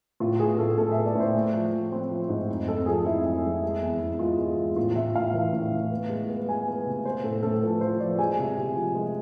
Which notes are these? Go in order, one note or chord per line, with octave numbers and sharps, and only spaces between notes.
A2 F4
B3 G#4
A2 A4
A2 A4
E5
B3
D5
A2 C5
A3
F3
F3
C4
F3
G#2
F2
F2 A4
F3 G#4
F2 E4
F2
F2
G#3
E2
E2
G#3 F4
G#3
E2
A2 F4
A2 E5
A2 F5
E3
A2
A2
B3
G#3
B3
G#3 G#5
B3
C3
B3 C5
A2 A4
A2 A4
F3 B4
F3 C5
F3 D5
G#3 G#5
C3
C3
F3
G#3